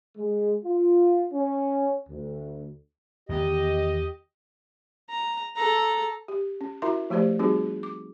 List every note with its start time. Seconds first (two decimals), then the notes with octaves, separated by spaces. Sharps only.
0.17 G#3
0.64 F4
1.32 C#4
2.09 D2
3.29 E2 D#3 B3 G4 D#5
5.09 A#5
5.56 A4 A#5
6.28 G4
6.61 C#4
6.82 E4 F#4 A#4 E5 A#5 C6
7.10 F3 A3 G4 C5 D5
7.39 G3 C4 D#4 F#4 G#4
7.83 D6